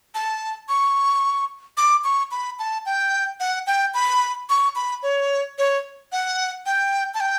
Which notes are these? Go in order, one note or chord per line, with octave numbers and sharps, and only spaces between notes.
A5
C#6
D6
C#6
B5
A5
G5
F#5
G5
B5
C#6
B5
C#5
C#5
F#5
G5
A5
G5